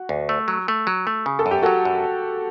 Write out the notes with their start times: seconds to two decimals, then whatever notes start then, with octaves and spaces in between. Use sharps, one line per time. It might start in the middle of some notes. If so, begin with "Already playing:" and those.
Already playing: F#4
0.09 D2
0.29 A3
0.48 F#3
0.68 A3
0.87 F#3
1.07 A3
1.26 C#3
1.39 A4
1.46 F#2
1.51 G4
1.63 F#3 F#4 A4
1.85 F#2